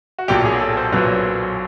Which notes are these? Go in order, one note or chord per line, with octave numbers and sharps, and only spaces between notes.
F#4
B1 A#2 F#3 G4
G#4
A4
C5
B1 A#2 F#3 B4